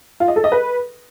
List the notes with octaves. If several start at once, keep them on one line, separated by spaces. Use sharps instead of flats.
F4
D#5
A4
D#5
B4